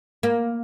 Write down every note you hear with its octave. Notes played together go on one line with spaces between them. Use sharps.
A#3